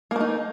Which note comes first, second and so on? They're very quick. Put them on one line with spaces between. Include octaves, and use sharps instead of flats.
A#3 A3 D#4